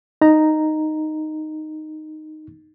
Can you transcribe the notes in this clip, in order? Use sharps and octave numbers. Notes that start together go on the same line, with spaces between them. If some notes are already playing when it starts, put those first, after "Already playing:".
D#4 A#5